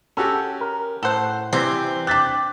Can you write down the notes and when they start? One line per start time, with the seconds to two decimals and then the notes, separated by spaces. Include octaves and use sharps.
0.17 C#4 F#4 G4 A4
0.61 A#4
1.03 A2 A4 C5 F#5
1.53 C3 E3 G3 C4
2.07 D4 G4 F#6 A6 B6